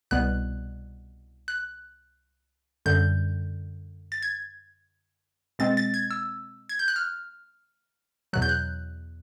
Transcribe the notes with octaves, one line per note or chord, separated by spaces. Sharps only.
C2 B2 G3 B3 F#6
F#6
F#2 D3 G3 G6
A6
G#6
B2 G#3 C4 A6
A6
G#6
E6
G#6
G6
F#6
F6
E2 B2 F#3 F#6
G6
F#6